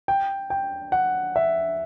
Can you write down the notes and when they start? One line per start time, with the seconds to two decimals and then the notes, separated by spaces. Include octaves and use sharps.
0.08 G5
0.50 G5
0.92 F#5
1.36 E5